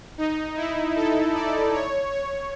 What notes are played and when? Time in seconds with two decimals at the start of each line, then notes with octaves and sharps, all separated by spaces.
0.18 D#4
0.57 E4
0.96 A4
1.34 D5
1.73 C#5
2.12 C#5